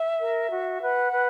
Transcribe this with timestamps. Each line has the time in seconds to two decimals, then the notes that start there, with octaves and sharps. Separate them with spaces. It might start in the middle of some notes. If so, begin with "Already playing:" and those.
Already playing: E5
0.18 A#4
0.49 F#4
0.80 B4 F#5
1.12 B4